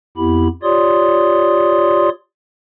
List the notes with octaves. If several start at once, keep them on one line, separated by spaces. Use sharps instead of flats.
F2 B3 E4 G4 B5
F4 G4 C#5 D5 C6 D#6